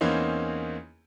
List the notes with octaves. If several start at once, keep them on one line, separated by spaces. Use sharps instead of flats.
E2 E3 A#3 C4 C#4 D#4